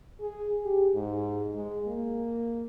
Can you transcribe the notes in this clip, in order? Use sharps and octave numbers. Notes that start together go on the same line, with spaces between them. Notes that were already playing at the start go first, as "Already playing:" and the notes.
G#4
G4
G#2
G#3
A#3